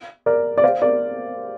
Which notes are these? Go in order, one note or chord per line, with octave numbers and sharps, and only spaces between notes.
A#4 D5
D5
C5 F5
A#4 D5